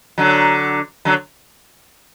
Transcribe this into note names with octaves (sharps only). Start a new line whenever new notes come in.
D3 F#3
D3 F#3